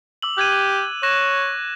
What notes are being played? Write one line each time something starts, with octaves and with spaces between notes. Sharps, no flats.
D6 E6 F#7
G4 F#6 G#6 D#7
C#5 F#6 A#6 E7